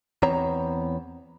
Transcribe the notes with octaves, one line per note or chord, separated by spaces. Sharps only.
E2 B3 C4 C#5 A#5